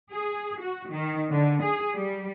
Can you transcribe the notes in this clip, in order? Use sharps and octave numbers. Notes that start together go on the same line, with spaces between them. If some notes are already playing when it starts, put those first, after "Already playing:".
G#4
F#4
D#3
D3
G#4
G3